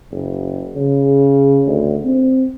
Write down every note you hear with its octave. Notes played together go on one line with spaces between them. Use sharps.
F#1
C#3
D2
C4